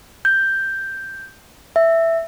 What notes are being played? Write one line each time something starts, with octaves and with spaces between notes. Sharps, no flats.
G6
E5